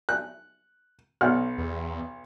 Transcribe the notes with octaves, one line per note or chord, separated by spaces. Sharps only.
F#6
B1 F#5 F6
E2